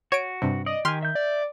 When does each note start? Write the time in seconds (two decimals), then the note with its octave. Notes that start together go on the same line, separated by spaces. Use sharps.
0.12 F#4 C#5 D7
0.42 G2 C3
0.66 D5 D#5
0.85 D#3 G4 G#5 C6 F6
1.02 E5 G6
1.15 D5